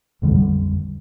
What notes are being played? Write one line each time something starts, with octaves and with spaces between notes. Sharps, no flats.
A#1 F2 D3 G3